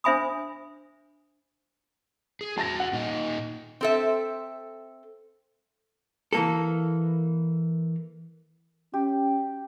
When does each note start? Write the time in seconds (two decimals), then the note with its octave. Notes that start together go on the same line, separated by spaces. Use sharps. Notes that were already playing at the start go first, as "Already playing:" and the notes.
0.04 D4 C5 E5 G#5 B5 D#6
2.41 G#4
2.58 F#4 E5 A5 A6 A#6
2.80 F#5
2.93 A#2 D#4
3.81 C4 A4 E5
6.33 E3 A#3 A4
8.94 C#4 G4